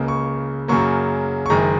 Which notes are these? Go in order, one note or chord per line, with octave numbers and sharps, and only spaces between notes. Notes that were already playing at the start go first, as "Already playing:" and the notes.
Already playing: C#2 C#3 A#3
C#6
F#2 C#3 F#3 A#3 C#6
C#6
F#1 F#2 D#3 G#3 A#5